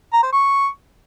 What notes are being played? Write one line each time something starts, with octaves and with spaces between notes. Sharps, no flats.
A#5
C5
C#6